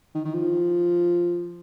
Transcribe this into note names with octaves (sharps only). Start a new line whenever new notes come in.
D#3
D#3
F3